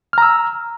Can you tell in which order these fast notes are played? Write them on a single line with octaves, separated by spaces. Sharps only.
F6 A#5 E6